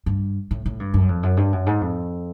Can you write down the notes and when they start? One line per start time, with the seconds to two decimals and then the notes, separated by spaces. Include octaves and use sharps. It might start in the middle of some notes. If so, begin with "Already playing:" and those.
0.06 G2
0.51 A2
0.66 A2
0.80 G2
0.94 F#2
1.09 F2
1.23 F#2
1.37 G2
1.52 F#2
1.67 G#2
1.81 F2